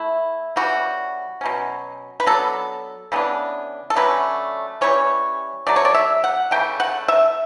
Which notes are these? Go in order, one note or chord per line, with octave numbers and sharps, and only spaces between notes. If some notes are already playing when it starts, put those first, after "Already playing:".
Already playing: A3 E4
C#3 E3 G3 F#4
B2 F#3 C#4
B4
F#3 B3 D4 A4
C#3 E3 B3 D4
A4
D3 F#3 A3 C#4 B4
E3 G3 C#4 C#5
F#3 A3 D4 D5
C#5
D5
E5
F#5
C#3 E3 A3 G5
F#5
E5